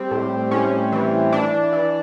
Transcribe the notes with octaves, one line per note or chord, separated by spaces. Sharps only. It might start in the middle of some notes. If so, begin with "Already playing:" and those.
Already playing: G3 C4
A2
A2 C#4
E3
E3 D4
E3